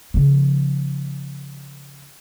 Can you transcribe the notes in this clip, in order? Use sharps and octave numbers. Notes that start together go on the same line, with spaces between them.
C#3 F3